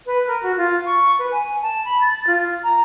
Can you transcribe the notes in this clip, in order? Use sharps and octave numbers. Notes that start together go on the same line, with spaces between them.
B4
A#4
F#4
F4
C#6
B4
G#5
A5
B5
A6
F4
A#5